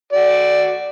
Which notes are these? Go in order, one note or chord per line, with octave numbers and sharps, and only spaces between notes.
F#4 D5